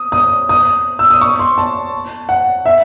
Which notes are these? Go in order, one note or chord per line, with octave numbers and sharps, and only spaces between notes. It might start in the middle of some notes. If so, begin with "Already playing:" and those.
Already playing: D#6
D#6
D#6
E6
D#6
C#6
C6
A5
F#5
E5